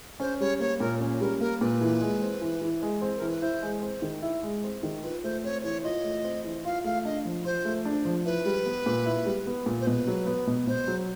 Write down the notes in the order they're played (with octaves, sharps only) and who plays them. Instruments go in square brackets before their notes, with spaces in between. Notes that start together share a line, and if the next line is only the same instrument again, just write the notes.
[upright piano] C#4 [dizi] C5
[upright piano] G3 [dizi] C#5
[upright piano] A#3 [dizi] C#5
[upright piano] A#2 [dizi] A#4
[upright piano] C#4
[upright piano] G3 [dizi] A#4
[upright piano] A#3 [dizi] A#4
[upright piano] A#2 [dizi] B4
[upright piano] E3
G#3
C4
E3
E3
G#3
C4
[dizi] A#4
[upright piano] E3
[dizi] B4
[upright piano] E4 [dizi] C5
[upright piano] G#3
C4
D#3
E4
G#3
C4
D#3
[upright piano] F4 [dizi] B4
[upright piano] A3 [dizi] C5
[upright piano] C4 [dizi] C#5
[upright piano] E3 [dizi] C#5
[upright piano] F4 [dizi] D#5
[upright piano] A3
C4
E3
[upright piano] F4 [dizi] F5
[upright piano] A3 [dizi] F5
[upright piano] D4 [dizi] D#5
[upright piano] F3
[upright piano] F4 [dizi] C5
[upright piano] A3
D4
F3
[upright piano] E4 [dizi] B4
[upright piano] G3
B3
A#2
E4
G3
B3
A#2
[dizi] C5
[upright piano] B2 [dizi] B4
[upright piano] F#3
B3
B2
[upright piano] B2 [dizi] C5
[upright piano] F#3